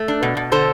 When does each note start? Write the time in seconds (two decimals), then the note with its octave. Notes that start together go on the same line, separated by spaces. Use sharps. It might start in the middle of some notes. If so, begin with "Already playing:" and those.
Already playing: A3
0.08 D4
0.23 B2
0.37 B2
0.52 D3 A4 C5